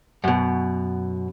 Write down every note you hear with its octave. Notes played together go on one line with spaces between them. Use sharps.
F#2 B2